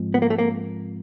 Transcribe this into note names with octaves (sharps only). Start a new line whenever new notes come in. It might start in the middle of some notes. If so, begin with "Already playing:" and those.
Already playing: G#2 F3 G#3 C4 F4
B3
A#3
A3
A#3